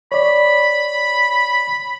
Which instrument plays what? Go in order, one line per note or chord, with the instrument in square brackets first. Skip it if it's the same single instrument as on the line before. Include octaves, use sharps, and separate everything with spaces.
[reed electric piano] C#5 D5 [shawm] B5